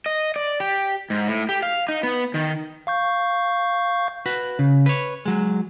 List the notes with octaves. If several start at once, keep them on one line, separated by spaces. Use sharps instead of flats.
D#5
D5
G4
G#2
A2
G4
F5
D#4
B3
D#3
F5 C#6 G6
F#4 B4
C#3
B4 C#5
F#3 G#3